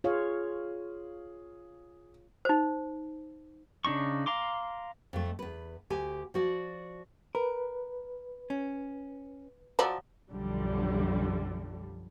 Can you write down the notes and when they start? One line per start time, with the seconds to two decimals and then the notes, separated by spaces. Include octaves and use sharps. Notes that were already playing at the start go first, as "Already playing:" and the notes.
0.04 F4 G#4 C#5 F5
2.45 D#4 C5
3.85 C#3 D4 D#4 C#6
4.26 F5 A#5 C6 D6
5.13 F2 A3
5.39 E2 B4
5.90 D2 G4 G#5
6.34 F3 F#4 D5
7.35 A#4 B4
8.50 C#4
9.79 F3 F#3 D5
10.30 B1 F#2 D3 F3 G3